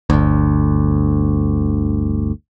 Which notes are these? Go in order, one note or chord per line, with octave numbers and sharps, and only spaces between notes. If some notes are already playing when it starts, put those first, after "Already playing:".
G1 D2